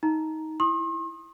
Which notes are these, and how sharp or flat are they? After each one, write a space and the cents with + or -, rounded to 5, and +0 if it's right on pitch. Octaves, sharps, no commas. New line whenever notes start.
D#4 +20 A#5 +0
E4 +0 C6 +40 D#6 +0